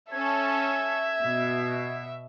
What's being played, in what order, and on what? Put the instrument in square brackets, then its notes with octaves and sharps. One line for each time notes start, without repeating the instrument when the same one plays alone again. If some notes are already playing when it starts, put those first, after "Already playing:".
[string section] C#4 A4 [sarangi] E5 [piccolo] G#6
[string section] B2